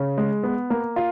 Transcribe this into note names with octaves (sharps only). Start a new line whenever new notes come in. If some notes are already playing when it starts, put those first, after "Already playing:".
Already playing: C#3
G#3
B3
A#3
F4